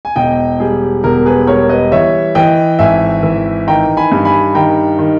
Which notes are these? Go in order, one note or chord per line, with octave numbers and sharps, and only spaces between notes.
G#5
E1 D#5 G5
G3 G#4
E1 A#4
G#4 B4
G3 A#4 C#5
B4 D#5
E3 C#5 E5
E3 D#5 G5
G#1 E5 G#5
E3
D#3 G5 A#5
G#5 B5
G2
G#5 B5
D#3 G5 A#5
D#3